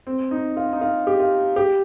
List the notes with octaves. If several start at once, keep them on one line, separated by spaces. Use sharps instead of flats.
C4
D#4
F4
D#4
F4
G4
F4
G4